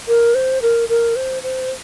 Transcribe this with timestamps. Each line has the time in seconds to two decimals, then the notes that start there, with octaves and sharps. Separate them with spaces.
0.08 A#4
0.35 C5
0.62 A#4
0.89 A#4
1.16 C5
1.43 C5